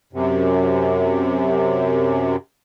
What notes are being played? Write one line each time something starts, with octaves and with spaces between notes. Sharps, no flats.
F#2 C3